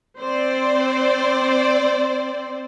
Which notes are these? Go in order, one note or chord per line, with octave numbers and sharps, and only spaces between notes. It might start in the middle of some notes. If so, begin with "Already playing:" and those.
C4 C5 D5